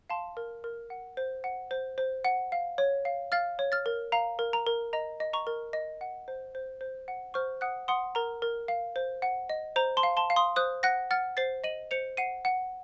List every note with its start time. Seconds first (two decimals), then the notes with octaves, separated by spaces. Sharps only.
0.10 F5 A5 C6
0.37 A#4
0.64 A#4
0.90 F#5
1.17 C5
1.44 F#5
1.71 C5
1.98 C5
2.25 F#5
2.52 F5
2.78 C#5
3.05 F5
3.32 F5 F6 A6
3.59 C#5
3.72 F6 A6
3.86 A#4
4.12 F5 A#5
4.39 A#4
4.53 A#5
4.67 A#4
4.93 D#5 A#5
5.20 D#5
5.33 A#5 C#6
5.47 A#4
5.73 D#5
6.01 F#5
6.28 C5
6.55 C5
6.81 C5
7.08 F#5
7.34 C5 C#6 F6
7.61 F#5 D#6 F#6
7.88 F#5 C6 D#6
8.15 A#4 A#5
8.42 A#4
8.68 F5
8.96 C5
9.22 F#5
9.50 D#5
9.76 C5 A#5
9.97 A5 C6
10.03 F5
10.17 A5 C6
10.30 F5
10.36 C6 D#6
10.56 C5 D#6 F#6
10.83 F#5 F#6 A#6
11.11 F#5 F6 A6
11.37 C5 A6 C7
11.64 D#5 D#7 F#7
11.91 C5 C#7 F7
12.17 F#5 C7 D#7
12.45 F#5